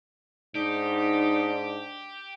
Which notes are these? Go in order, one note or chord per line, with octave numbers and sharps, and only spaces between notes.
G#2 D4 D#4 G4